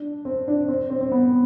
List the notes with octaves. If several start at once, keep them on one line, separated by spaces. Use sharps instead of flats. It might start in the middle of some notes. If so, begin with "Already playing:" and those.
Already playing: D4
C4
D4
C4
C4
C4
B3